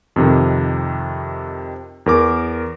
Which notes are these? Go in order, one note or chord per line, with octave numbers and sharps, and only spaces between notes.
F2 C3 D#3
E2 A#4 D6